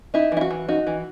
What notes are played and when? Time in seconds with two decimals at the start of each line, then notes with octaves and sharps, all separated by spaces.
0.14 D#4 E4
0.32 E3 E4
0.41 F#4
0.51 E3
0.68 D#4 F#4
0.87 E3